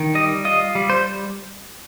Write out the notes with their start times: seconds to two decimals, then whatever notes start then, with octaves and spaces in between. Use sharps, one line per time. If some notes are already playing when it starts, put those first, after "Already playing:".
Already playing: D#3
0.14 G3 D#5
0.45 F4 D#5
0.75 G3
0.90 C5